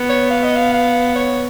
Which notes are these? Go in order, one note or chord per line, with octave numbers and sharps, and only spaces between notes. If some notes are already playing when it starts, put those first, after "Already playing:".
Already playing: B3
C#5
F5
D#5
F5
F5
C#5